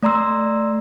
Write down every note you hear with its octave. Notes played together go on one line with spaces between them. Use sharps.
A3 D5 A#5 C6 E6